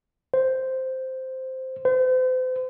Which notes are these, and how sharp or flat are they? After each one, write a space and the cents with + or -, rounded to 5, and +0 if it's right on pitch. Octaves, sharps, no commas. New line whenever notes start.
C5 -5
C5 -40